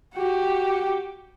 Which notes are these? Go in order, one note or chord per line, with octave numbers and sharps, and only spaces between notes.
F#4 G4